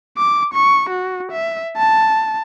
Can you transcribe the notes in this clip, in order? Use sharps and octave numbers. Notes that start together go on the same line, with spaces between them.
D6
C#6
F#4
E5
A5